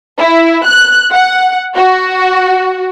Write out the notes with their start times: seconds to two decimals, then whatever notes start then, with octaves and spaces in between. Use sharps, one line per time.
0.18 E4
0.65 F#6
1.12 F#5
1.75 F#4